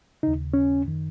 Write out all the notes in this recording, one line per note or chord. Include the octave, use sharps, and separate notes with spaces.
D#2 C#3 D#4
C#4
F#2 D#3